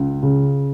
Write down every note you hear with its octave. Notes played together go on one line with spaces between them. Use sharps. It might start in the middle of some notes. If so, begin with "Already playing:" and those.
Already playing: C#2
C#3